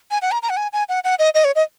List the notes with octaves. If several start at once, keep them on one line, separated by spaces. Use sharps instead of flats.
G#5
F#5
A#5
A#5
F#5
G#5
G#5
F#5
F#5
D#5
D#5
C#5
D#5